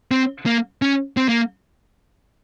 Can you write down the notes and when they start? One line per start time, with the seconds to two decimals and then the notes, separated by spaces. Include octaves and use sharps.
0.11 C4
0.46 A#3
0.82 C#4
1.17 C4
1.28 A#3